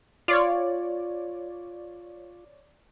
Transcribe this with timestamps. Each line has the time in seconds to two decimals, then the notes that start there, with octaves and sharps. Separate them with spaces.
0.28 F4 C#5 D5